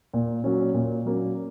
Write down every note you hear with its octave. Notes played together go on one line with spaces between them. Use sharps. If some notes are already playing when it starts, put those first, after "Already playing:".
A#2
F#3 A#3 C#4
A#2
F#3 A#3 C#4